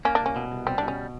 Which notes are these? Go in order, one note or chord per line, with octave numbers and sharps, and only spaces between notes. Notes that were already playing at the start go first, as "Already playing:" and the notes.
A#3 C#4
D4
C2 C#4
B2
C2
G3 C4
B2 D4
C#4